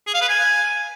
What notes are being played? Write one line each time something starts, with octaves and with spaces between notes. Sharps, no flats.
G#4
F5
B4
G#5